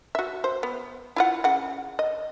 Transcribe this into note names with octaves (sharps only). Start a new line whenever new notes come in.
F#4 E5
C5
B3
E4 F4 F#5
C#3 F#5
D#5